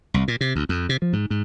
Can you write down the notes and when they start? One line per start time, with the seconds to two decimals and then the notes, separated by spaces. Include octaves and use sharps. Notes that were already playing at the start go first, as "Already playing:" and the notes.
0.14 C2
0.28 A#2
0.41 C3
0.56 D2
0.69 F2
0.89 C3
1.02 F3
1.13 G#2
1.30 G#2